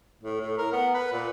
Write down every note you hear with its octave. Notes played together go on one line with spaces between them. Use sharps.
A2
A2
A#4
B3
B4
A#2